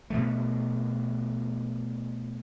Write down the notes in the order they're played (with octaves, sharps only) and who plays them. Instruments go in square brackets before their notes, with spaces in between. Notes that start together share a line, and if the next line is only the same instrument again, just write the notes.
[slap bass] B2 F3 A3